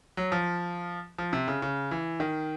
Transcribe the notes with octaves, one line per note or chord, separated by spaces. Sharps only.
F#3
F3
F3
C3
C#3
C#3
E3
D#3